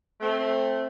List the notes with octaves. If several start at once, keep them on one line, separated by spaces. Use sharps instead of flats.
A3 C4